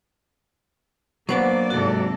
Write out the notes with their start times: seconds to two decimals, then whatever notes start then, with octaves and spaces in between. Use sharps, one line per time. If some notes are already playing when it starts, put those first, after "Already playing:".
1.29 F#3 A#3 B3 D4 C5 D5
1.70 G#2 C3 F#4 A4